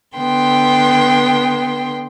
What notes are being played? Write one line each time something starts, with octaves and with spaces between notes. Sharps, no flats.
D3 B3 G5 C6